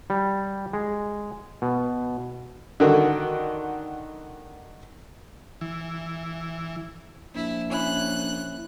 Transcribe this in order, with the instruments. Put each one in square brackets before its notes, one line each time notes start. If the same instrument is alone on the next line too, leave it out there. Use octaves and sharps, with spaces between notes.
[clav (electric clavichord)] G3
G#3
B2
[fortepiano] D3 D#3 F#4
[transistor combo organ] E3
[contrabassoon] A#1 [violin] E4
[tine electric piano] C#4 E4 [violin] F#6